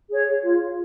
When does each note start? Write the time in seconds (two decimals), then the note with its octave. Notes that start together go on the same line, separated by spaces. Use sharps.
0.11 G#4 C#5
0.42 F4